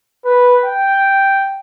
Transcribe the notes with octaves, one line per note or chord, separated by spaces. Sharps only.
B4
G5